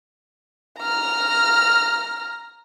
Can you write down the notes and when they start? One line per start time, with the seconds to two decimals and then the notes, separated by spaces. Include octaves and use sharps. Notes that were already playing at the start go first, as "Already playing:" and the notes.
0.80 A#5 F6